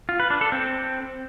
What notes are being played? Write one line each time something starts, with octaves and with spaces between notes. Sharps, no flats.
F4
B4
D4
A4
C4